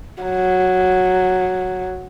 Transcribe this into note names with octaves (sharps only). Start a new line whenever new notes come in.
F#3